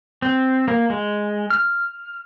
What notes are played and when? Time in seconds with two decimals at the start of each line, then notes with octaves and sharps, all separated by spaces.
0.22 C4
0.68 A#3
0.90 G#3
1.50 F6